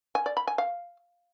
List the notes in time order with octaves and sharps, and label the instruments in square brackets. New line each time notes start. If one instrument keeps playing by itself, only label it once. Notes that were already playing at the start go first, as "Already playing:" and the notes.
[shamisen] G#5
D5
B5
G#5
F5